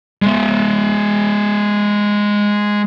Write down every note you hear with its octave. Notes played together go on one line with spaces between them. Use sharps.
G#3 E5